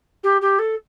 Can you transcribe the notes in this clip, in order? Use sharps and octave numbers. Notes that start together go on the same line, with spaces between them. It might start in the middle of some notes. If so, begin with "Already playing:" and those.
G4
G4
A4